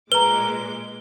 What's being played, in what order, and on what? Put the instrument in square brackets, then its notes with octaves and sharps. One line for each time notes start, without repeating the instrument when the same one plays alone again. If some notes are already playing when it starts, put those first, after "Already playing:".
[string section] A#2 G#3 D6 [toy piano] B4 A#5 [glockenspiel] G7